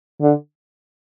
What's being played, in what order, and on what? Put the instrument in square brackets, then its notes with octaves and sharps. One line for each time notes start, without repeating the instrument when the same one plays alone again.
[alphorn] D3